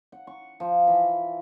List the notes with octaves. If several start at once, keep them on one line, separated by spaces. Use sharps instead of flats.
F#5
C#6
F3
E3